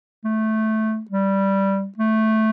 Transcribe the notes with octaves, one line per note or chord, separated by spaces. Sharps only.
A3
G3
A3